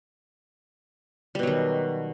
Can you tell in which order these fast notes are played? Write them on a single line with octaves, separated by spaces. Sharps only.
G3 B2 F#3 D#3